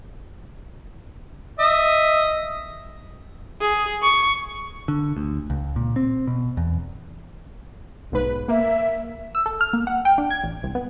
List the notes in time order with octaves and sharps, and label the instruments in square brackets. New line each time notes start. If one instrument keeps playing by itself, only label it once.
[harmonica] D#5 E5
[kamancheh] G#4
C#6
[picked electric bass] D3
D2
C#2
A#2
C4
B2
E2
[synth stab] B1 G#2 B4
[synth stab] A#3 [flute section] E5
[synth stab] E6
A4
F6
A#3
F#5
G5
D4
G#6
A1
C2
B3